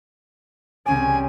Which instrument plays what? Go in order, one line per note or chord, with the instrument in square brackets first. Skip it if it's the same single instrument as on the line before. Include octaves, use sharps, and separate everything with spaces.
[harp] C2 C#4 D5 [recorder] G#5